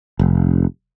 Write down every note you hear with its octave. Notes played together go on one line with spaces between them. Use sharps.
F1